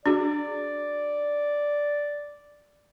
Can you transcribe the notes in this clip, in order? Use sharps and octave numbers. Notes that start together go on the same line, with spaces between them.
D4 F#4 G#4 D5